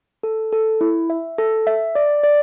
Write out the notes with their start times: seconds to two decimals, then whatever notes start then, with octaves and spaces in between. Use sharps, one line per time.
0.23 A4
0.53 A4
0.81 E4
1.10 E5
1.38 A4
1.67 E5
1.95 D5
2.24 D5